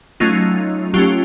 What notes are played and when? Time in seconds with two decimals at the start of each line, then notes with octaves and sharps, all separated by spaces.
0.20 F#3 A3 C#4 D#4 F4
0.94 F#3 A3 C#4 F4 G4